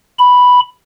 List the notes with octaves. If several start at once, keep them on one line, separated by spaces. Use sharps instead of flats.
B5